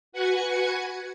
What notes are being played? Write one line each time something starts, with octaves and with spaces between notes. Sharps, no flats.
F#4 B4 F#5 G#5 G#6 C#7